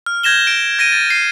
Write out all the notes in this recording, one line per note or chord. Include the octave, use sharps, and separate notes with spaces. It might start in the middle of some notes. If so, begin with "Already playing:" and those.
F6
G6 G#6 A#6 E7 G7
D7
G#6 A#6 D7 D#7
A6
C7 D#7